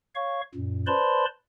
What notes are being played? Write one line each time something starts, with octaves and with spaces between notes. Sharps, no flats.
C#5 F5 C#6
F#2 A#2
B4 C5 D5 A5 B5 C6